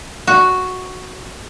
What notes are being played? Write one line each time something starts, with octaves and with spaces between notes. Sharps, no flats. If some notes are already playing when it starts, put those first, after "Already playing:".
F#4